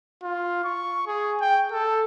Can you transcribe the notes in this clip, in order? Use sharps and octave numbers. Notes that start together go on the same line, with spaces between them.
F4
C#6
G#4
G5
A4